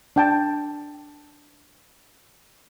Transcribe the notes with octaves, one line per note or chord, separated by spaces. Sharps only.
D4 G5 A5